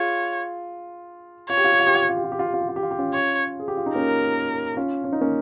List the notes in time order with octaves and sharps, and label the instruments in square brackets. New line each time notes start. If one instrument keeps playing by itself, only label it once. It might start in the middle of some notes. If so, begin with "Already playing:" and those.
Already playing: [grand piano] F4 G#4 [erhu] C#5
[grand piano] F4 [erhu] C#5
[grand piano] G4
F4
G4
F4
G4
F4
G4
F4
G4
F4
G4
F4
G4
F4
G4
F4
G4
F4
G4
C#4 F4
[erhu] C#5
[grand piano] G#4
G4
F4
D#4
[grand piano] A#3 C#4 [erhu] A#4
[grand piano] C#4 F4
C#4
D#4
A#3 C#4